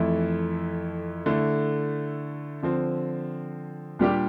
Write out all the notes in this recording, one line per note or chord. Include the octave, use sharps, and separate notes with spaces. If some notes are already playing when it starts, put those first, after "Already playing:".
Already playing: F2 E3 A3 E4 A4
D3 A3 E4
D3 F3 C4
A#2 G3 D4 G4